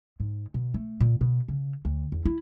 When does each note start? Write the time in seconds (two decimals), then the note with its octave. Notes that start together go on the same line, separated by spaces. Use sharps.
0.20 G#2
0.54 B2
0.74 A3
1.00 A#2
1.21 B2
1.48 C#3
1.85 D2
2.12 E2
2.26 E4